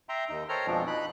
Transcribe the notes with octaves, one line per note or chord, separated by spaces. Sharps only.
E5 G5 A#5 C6
D#2 D#4
A4 C5 C#5 G5 A#5 F6
F2 B2 F3 G#3 D4
D#4 B5 F#6